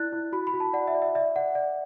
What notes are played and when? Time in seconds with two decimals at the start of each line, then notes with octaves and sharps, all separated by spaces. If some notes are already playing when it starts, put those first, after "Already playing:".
Already playing: E4 D5 F#6 A6
0.13 E4
0.33 F#4 B5
0.47 B5
0.54 F#4
0.60 A5
0.73 D5 F#5
0.88 E5
0.95 D5
1.02 E5
1.15 D5 E5
1.36 D5 F#5
1.55 D5